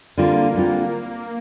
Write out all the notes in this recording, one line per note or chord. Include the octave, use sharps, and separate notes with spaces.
D3 G3 A#3 C4 F4
D3 G3 C4 F4